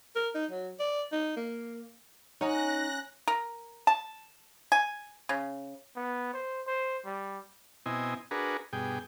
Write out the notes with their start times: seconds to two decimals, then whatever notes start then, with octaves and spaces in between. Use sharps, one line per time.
0.16 A#4
0.35 D#4
0.51 F#3
0.80 D5
1.12 D#4
1.36 A#3
2.41 C#4 D#4 F#5 G#5 A#5 F#6 A#6
3.28 A#4
3.87 A5
4.72 G#5
5.29 C#3
5.96 B3
6.33 C5
6.67 C5
7.05 G3
7.86 B2 C4 E4 D#5 G#5
8.31 D4 F#4 G#4 A#4 B4
8.73 G2 B2 G#4 G5